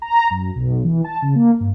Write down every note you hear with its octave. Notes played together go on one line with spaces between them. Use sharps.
A#5
F#2
B1
E3
A5
C#3
A#3
G2